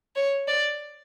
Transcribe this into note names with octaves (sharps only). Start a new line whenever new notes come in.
C#5
D5